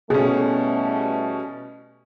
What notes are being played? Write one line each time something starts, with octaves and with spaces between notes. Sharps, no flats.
E2 B2 G3 A3 C#4 G#4